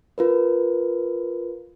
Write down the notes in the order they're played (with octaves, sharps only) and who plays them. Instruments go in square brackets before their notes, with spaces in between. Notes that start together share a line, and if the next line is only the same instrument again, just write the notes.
[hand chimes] F4 A#4 B4